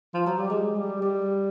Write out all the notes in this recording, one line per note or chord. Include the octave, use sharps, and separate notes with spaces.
F3
F#3
G3
G#3
G3
G3